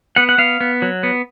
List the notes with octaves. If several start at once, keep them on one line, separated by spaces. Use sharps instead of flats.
B3 F#5
F#5
B3 F5
B3
F#3
B3